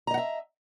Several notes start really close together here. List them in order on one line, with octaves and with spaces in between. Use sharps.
A#5 D#5 F#5 E5